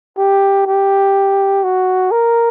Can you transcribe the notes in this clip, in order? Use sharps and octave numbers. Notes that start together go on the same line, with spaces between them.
G4
G4
F#4
A#4